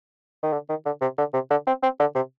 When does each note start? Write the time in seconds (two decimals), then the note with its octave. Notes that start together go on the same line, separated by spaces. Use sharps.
0.43 D#3
0.53 D3
0.69 D#3
0.86 D3
1.01 C3
1.18 D3
1.34 C3
1.50 D3
1.67 C4
1.83 C4
2.00 D3
2.15 C3